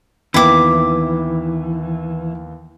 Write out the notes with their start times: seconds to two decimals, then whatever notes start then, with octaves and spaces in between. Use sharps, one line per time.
0.34 D#2 E3 B3 E4 G5 D6